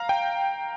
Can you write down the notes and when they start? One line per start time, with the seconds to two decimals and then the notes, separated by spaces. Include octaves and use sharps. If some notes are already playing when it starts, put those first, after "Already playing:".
Already playing: F5 A#5
0.09 G5